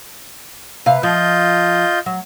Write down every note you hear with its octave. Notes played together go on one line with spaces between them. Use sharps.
C3 B4 F5
F3 F4 D#5 G6
F#3